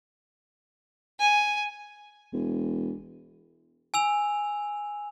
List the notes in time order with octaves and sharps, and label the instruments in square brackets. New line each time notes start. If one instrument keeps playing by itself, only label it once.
[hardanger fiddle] G#5
[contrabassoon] E1
[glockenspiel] G#5 E6 F7